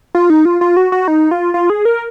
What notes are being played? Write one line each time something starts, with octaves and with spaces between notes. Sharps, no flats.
F4
D#4
F4
F4
F#4
F#4
D#4
F4
F4
G#4
A#4